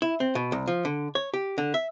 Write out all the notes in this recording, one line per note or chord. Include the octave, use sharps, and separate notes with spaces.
E4
C4
B2
C2
F3
D3
C#5
G4
D3
E5